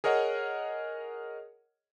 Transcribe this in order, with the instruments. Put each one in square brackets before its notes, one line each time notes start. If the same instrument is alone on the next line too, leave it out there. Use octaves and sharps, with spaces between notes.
[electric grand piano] G#4 A#4 C#5 D#5 F#5